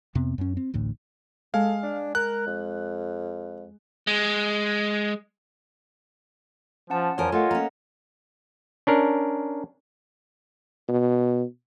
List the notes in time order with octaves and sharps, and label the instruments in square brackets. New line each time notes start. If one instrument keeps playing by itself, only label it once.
[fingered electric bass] F2 C3 B3 C4
F#2 C#4
C4
A1 D2 A2
[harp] G#3 [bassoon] A4 [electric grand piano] F5
[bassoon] D4
[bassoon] A#4 [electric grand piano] F#6
[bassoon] F2
[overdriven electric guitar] G#3
[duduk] F3 [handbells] C#4 F#5 A5
[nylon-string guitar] E2 A#4 [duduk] F3 [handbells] C#5 G#5
[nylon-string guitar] A3 [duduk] F4 [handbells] A#4 D#5 F#5
[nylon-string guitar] A#3 C#4 [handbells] A#5
[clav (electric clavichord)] C#4 D4 A#4
[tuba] B2